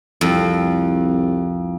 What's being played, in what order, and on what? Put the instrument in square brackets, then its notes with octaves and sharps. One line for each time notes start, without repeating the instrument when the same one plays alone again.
[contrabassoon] C2 [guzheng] F2